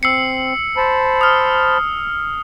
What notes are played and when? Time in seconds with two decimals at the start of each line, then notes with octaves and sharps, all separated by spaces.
0.03 C4 E6 C7 C#7
0.77 C5 A5 B5
1.21 D#6 F6